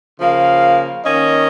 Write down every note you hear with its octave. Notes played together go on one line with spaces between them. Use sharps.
C#3 F3 A#3 F5
D#3 A#3 C#4 D#5